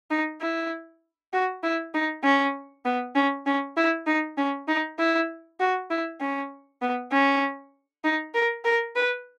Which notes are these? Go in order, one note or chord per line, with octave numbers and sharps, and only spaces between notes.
D#4
E4
F#4
E4
D#4
C#4
B3
C#4
C#4
E4
D#4
C#4
D#4
E4
F#4
E4
C#4
B3
C#4
D#4
A#4
A#4
B4